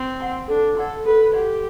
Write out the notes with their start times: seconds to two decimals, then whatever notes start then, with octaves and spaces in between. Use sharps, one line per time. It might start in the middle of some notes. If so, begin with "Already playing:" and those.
Already playing: C4
0.20 F#5 C6
0.48 D4 A4
0.77 A4 D5 F#5 C6
1.06 A4 B4
1.33 G4 D5 F#5 C6